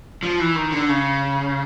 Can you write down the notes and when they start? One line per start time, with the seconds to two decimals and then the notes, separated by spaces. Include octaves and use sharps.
0.23 F3
0.40 E3
0.55 D#3
0.72 D3
0.88 C#3